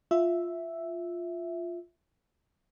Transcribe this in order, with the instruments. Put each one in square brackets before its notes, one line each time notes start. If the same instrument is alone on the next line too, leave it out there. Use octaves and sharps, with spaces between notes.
[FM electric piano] F4 E5